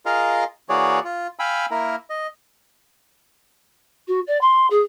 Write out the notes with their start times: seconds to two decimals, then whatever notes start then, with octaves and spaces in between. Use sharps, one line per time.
0.06 F4 G#4 A#4 D#5 F5
0.69 E3 A#3 F#4 G#4 C#5 D5
1.04 F4
1.39 F5 G5 G#5 B5 E6
1.71 A#3 E4 A#4
2.10 D#5
4.08 F#4
4.27 D5
4.41 C6
4.70 G#4